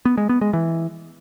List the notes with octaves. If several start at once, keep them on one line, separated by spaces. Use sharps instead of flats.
B3
G#3
B3
G#3
E3